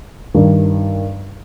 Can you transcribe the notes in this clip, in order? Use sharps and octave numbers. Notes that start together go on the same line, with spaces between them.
G2 D#3 G3